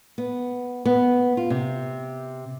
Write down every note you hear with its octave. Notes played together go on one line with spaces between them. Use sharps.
B3
B3
F4
C3